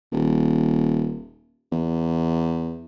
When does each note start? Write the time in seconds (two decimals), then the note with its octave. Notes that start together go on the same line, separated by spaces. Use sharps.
0.12 D#1
1.72 E2